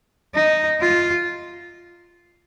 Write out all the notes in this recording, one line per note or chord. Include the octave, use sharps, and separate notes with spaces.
D#4
F4